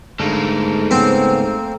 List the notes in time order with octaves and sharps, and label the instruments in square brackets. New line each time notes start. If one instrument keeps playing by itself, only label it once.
[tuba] G#2 [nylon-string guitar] D3 [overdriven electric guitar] A3 A#3
[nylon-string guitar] C#3 B3 [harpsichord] C4